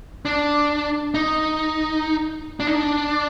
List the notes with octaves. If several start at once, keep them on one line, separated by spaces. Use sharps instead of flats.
D4
D#4
D4
D#4
D4